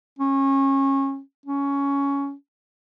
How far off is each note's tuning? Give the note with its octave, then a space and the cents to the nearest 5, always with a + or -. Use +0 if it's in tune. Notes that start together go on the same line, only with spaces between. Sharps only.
C#4 -25
C#4 +10